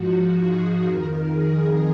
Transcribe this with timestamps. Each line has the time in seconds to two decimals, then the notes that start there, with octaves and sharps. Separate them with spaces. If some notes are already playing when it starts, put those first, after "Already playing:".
Already playing: G#2 F3 F#4
0.37 G#4
0.84 F2 D#3 A#4
1.31 G#4